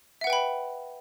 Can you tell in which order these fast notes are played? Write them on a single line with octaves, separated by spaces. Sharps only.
E5 F#5 B4 G5 B5